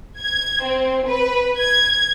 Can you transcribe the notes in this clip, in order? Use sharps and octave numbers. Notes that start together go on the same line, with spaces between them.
G#6
C4
B4
G#6